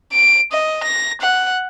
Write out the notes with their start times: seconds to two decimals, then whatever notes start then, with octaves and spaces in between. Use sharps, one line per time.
0.12 D7
0.52 D#5
0.83 A#6
1.21 F#5